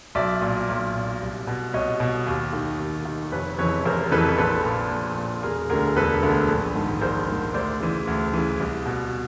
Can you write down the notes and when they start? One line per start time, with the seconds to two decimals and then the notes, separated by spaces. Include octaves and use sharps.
0.15 B1 D5 E5
0.42 A#2
0.69 B1
0.95 A#2
1.21 C2
1.47 B2
1.74 C2 C#5 D#5
2.00 B2
2.27 D#2
2.53 D#3
2.80 D#2
3.05 D#3
3.32 F1 B4 C#5
3.58 F2 C#3 E3 B4 C#5
3.85 F1 A#4 C5
4.11 F2 C#3 E3 A4 B4
4.38 A#1 A4 B4
4.64 A#2
4.90 A#1
5.17 A#2
5.43 E1 G#4 A#4
5.69 D2 D3 G#4 A#4
5.96 E1 A4 B4
6.23 D2 D3
6.49 A#1
6.75 G#2 D#3
7.01 A#1 A#4 C5
7.29 G#2 D#3
7.54 D2 C5 D5
7.80 C#3 E3
8.07 D2
8.33 C#3 E3
8.60 C2
8.86 B2